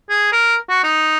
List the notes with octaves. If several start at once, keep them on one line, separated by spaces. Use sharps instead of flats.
G#4
A#4
F#4
D#4